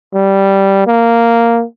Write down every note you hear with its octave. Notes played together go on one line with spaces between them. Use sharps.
G3
A#3